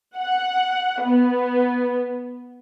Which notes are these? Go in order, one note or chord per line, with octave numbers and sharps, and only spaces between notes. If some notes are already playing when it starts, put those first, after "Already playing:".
F#5
B3